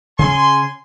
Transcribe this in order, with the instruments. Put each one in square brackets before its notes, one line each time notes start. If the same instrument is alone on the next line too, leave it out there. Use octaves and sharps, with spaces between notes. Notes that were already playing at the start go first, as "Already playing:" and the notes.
[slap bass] C#3 C#4 [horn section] G#5 C6